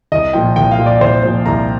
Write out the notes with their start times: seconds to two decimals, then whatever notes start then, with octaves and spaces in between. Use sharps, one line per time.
0.12 C2 D#5
0.33 A#2 F3 G5
0.56 C2 G5
0.71 F5
0.79 A#2 F3
0.86 D5
1.00 C2 C5
1.23 A#2 F3 C5
1.46 C2 A#5